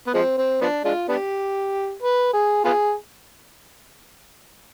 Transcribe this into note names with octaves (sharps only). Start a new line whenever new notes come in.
B3
F3 G#3 C4
C4
F3 B3 D4
G#3 D4 F4
B3 D4 G4
B4
G#4
B3 F4 G#4